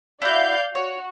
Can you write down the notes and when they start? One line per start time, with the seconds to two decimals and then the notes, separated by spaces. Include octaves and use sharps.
0.22 E4 F#4 D5 F5 G6
0.75 F#4 C#5